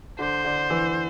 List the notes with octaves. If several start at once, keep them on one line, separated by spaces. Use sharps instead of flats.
D3 C5
D3
E3